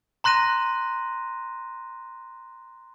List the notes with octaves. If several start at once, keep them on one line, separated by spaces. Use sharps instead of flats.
A#5 C6 F#6 A#6 D#7